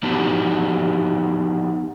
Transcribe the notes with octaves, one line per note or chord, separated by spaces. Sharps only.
F3 B3 D#4 F#4 G4 A5